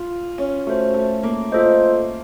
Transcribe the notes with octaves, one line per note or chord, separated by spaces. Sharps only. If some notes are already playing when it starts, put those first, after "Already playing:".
Already playing: F4
C#4
A3 F#4 A4 C5
A3
A#3
F4 A4 C5 D#5